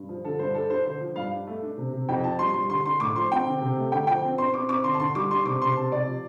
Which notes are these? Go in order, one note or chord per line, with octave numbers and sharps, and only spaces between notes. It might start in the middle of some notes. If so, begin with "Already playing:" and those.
Already playing: G2
F3
D3 A4
G2 C5
D4 A4
D4 C5
D3 C5
F3
G2 F5
D4
A3
D4
C3
C3
F2 G5
F3 A5
G3 C6
G3 C6
D3 C6
D3 C6
A2 D6
F3 C6
C4 G5
D3
C3
A3
D3 G5
F3 G5
C4
C4 C6
C4 D6
C4 D6
D3 C6
A5
D3 C6
G3 D6
D4 C6
C3 D6
C3 C6
C3 A5
C3 D5
F3